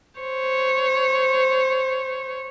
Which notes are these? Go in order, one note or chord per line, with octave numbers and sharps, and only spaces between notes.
C5 C#5